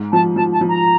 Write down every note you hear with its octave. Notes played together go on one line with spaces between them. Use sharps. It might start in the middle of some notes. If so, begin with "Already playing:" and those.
Already playing: G#2
F3 A5
F3 A5
A5
F3
A#5